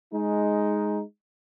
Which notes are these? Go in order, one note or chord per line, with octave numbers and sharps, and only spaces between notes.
G#3 D#4